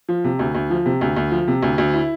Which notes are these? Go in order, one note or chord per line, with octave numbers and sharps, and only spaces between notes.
F3
C3
D2
D2
F3
C3
D2
D2
F3
C3
D2
D2
E4